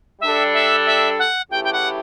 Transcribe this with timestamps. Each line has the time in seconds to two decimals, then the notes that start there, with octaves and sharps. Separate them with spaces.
0.21 G3 D4 A4 E5
0.53 E5
0.86 E5
1.19 F#5
1.51 C#3 E3 A3 E4 G4 G5
1.64 G5
1.73 F#5